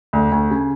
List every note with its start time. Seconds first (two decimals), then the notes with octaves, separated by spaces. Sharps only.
0.13 D2
0.32 D2
0.51 C#3